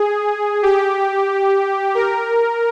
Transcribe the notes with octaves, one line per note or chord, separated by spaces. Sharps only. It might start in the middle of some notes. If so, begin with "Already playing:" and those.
Already playing: G#4
G4
A#4